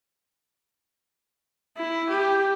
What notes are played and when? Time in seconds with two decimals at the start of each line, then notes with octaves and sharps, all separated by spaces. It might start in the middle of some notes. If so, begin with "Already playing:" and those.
1.77 E4
2.09 G4